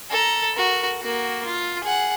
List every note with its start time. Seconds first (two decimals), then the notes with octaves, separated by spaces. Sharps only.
0.11 A4 A#5
0.56 F#4 A#4
1.01 A#3 F#4
1.46 F4
1.84 G#4 F#5